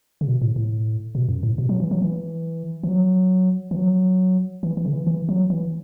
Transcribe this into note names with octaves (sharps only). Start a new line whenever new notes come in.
C#3
B2
A2
A2
B2
F#2
A2
B2
F#3
E3
F#3
E3
E3
F#3
E3
F#3
E3
E3
C#3
E3
E3
F#3
E3